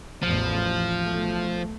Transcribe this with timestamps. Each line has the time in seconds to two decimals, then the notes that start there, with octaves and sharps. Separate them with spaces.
0.22 A1 E2 F3
1.01 B1 A3